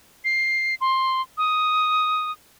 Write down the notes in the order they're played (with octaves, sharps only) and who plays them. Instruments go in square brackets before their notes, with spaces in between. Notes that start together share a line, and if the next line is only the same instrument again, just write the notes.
[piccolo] C7
C6
D#6